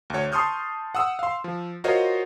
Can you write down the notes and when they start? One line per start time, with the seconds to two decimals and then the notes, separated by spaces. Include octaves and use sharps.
0.10 D2 C#5
0.32 A5 C6 C#6 D#6 F6 G6
0.95 F#5 D#6 E6
1.19 F5 C6
1.44 F3
1.84 F4 F#4 A#4 C5 C#5 D#5